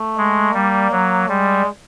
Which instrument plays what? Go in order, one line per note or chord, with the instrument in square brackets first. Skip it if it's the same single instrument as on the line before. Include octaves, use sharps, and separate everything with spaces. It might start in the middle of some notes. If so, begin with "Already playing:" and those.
Already playing: [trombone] A3
[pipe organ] G#3
[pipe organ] G3 [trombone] A#3
[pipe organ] F#3
[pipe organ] G3 [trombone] G#3